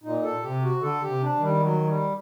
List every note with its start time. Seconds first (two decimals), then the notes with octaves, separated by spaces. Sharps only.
0.03 A#2 D#4
0.23 A4
0.43 C3 G4
0.62 F#4
0.81 D3 A4
1.01 G4
1.08 C3
1.21 D4
1.34 D#3
1.41 G3
1.60 F#3
1.86 G3